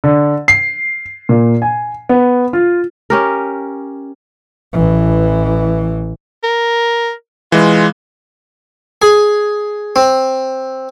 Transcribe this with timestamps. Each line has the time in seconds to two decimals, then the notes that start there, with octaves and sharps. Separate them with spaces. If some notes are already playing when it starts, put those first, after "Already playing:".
0.04 D3
0.48 C7
1.29 A#2
1.62 G#5
2.09 B3
2.53 F4
3.10 C#4 G4 A#4
4.73 A1 E3
6.44 A#4
7.52 E3 G#3 F4
9.02 G#4
9.96 C4